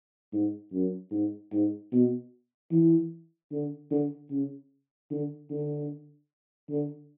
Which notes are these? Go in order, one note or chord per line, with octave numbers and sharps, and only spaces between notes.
G#2
F#2
G#2
G#2
B2
E3
D3
D3
C#3
D3
D3
D3